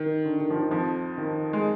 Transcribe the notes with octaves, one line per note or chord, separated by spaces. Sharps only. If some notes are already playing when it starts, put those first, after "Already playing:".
Already playing: D#3
D3
D#3
F3
D#3
F2 F3
D#3
G#3